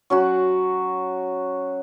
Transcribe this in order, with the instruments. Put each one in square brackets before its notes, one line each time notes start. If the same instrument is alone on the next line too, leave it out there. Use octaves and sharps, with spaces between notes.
[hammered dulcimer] F#3 C#4 F#4